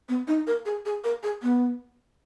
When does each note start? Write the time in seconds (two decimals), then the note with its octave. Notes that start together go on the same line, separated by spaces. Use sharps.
0.09 B3
0.27 D#4
0.47 A#4
0.66 G#4
0.85 G#4
1.04 A#4
1.23 G#4
1.43 B3